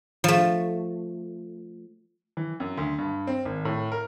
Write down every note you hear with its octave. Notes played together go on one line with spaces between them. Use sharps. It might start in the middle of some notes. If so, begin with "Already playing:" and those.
F3 A3
E3
F#2
D2
G2
C4
G#1
A2
A#4